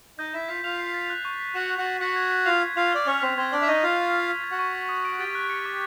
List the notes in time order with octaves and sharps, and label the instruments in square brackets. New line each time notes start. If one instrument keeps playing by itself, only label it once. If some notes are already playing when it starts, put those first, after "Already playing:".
[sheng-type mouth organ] D#4 D#5 [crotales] G6
[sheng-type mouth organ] E4 E5 [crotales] E7
[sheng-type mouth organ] F4 F5 [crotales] B6
[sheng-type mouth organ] F4 F5 [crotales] F7
[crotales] C7
A6
F#6
C#6
B6
[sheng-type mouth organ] F#4 F#5 [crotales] E7
[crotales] E7
[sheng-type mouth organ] F#4 F#5
[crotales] A6
[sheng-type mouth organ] F#4 F#5 [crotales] B6
[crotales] G#6
B6
[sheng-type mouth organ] F4 F5 [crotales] F7
[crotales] G#6
[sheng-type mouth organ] F4 F5 [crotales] F7
[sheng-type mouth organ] D5 [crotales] F6
[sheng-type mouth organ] C#4 C#5 [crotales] F6
[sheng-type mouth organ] C4 C5 [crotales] B6
[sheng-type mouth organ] C4 C5 [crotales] G#6
[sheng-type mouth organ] D4 D5 [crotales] F6
[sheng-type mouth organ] E5
[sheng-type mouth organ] D#4 D#5 [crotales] C#6
[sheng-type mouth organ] F4 F5 [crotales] A6
[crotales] A6
A6
B6
G#6
[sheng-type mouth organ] F#4 F#5
[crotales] C#6
A6
D#6
D7
[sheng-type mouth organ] G4 G5 [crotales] A6
[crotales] F#6
C#7
D6